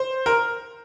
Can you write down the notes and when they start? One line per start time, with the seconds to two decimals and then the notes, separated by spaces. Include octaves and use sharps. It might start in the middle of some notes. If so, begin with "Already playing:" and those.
Already playing: C5
0.26 A#4